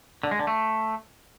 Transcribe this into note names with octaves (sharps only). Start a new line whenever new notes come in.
D3
G#3
D3
A3